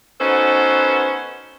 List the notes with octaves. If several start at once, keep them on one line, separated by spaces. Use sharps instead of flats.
B3 C#4 D#4 F#4 A4 C5